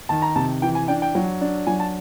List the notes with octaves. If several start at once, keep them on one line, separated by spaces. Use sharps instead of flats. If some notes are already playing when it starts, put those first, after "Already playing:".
D#3 A5
A#5
C3 A5
E3 G5
G#5
D4 G5
G5
F#3
D4
F#3 G#5
A5